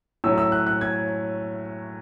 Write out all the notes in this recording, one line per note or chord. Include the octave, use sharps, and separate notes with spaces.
A2 F#3 C#4 E6
E6
F#6
F#6
G#6